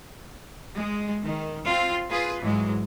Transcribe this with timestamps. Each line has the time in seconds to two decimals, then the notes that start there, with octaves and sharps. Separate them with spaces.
0.76 G#3
1.23 D#3
1.68 C4 F4
2.10 F4 G#4 B4
2.42 G#2 E3 F#3 G#3